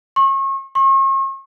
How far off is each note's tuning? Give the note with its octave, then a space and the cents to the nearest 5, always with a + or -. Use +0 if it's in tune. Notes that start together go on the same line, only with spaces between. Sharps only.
C#6 -35
C#6 -45